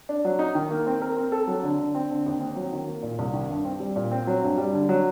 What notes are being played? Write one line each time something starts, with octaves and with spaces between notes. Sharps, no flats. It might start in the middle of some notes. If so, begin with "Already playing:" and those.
D4
F#3
D#4
D#3
A#3
C4
A#4
C4
A4
F#3
D3
D3
C4
D3
D#2
C4
F#3
D#3
A#3
A#2
C2
D#3
G2
C4
G3
A#2
C4
F#3
G2
G3
D3
F#3